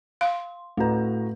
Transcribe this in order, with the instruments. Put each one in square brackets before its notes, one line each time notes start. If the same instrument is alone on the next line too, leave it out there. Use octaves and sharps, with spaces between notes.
[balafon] F5 [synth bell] C6
[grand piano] A2 F#4 A#5 [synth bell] A3 B4